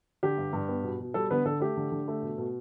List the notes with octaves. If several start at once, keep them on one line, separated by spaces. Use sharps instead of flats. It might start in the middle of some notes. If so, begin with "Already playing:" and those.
D3 G4
G2
G2
B3
B2
B2
G3 A4
D3 B3 B4
D3 A4
A3 G4
D3
D3
A3
B2
B2